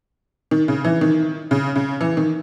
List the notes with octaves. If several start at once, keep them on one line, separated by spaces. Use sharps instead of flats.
D#3
C#3
E3
D#3
C#3
C#3
E3
D#3